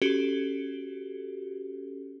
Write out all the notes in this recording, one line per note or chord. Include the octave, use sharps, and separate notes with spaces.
C#4 F#4 G4 A4